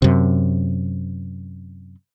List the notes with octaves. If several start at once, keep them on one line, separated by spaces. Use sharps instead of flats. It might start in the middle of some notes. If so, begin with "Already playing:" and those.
F#2 C3